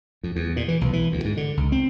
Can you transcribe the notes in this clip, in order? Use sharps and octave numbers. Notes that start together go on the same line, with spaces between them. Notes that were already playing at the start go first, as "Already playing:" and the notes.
F2
E2
A#2
E3
B1
E3
D2
G#2
D3
C#2
C4